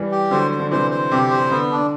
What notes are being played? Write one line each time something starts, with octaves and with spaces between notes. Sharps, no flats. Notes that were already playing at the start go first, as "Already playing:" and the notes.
Already playing: E3 G3
G4
D3 F#3 C5
C5
D3
C3 E3 C5
C5
C3 G4
C5
D3 B3
D4